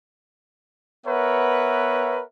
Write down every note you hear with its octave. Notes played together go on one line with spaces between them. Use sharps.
B3 A#4 B4 C#5 E5 F#5